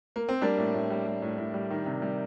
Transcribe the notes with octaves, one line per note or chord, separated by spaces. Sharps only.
A#3
C4
G3 A#3 D4
A2
A2
G3
G3
A2
A2
G3
D#3
C3
G3